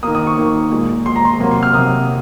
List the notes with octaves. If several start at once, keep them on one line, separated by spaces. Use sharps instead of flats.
D#3 A#3 D#6
D#6
C#6
D#3 A#3
A#2 G#3
A#2 G#3 C6
A#5
C6
C3 F#3 A#3 A#5
C6
F6
C3 F#3 A#3 D#6